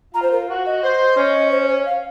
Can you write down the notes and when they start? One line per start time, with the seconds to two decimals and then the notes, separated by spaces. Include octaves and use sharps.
0.14 F4 A#5
0.22 C5
0.32 A#4
0.48 F#4
0.66 D#5
0.83 C5
1.17 C#4
1.51 C5
1.68 C#5
1.86 F5